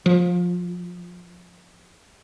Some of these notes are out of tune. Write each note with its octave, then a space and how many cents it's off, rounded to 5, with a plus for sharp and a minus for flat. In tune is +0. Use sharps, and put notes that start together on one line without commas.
F3 +20